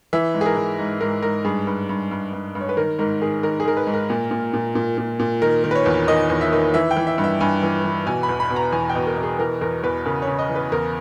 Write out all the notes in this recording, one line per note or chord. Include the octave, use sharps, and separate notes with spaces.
E3 E5
G#2
G#4
A#4
E3
G#2
G#2 A#4
G#2 A#4
G2 G#4
G2
G2
G2
G2
G2
C#5
B4
D#3 A#4
G#2 A#4
D#3 G#4
D#3 A#4
G#4
D#3 A#4
B4
G#2
A#4
A#2
A#2
A#2
A#2
A#2
A#2
D#3 A#4
D#3
B4
C#5
E2
D#3 D#5
E2
E5
D#3
E3 E5
G5
E3
E5
G2
E5
G2 G#5
E3
E3
B2 G#5
B5
E2
B5
B2
A#5
E2 G#5
G5
B2
A#4
B2
G#4
E3 A#4
E2 A#4
E2 B4
C#3 A#4
C#5
C#3
D#5
E3
B4
E2 A#4